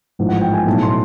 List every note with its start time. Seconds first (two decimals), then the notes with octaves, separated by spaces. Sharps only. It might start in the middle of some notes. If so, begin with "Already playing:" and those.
0.19 A1 G#2 F3
0.29 F#5
0.41 G5
0.54 G#5
0.66 B1 A2 F#3 A5
0.82 C6